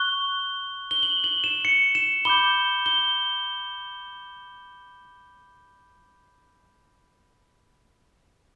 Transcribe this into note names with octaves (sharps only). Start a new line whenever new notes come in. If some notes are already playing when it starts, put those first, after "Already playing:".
Already playing: C#6 F#6 G7
G7
F#7
F#7
E7
C#7
E7
B5 D6 G6 G7
G7